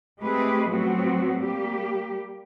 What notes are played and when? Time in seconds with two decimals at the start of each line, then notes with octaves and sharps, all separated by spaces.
0.19 G#3 A3 C4 G4 G#4 B4
0.69 A2 F3 F#3 B3 C4 F#4
1.38 G3 A#3 G4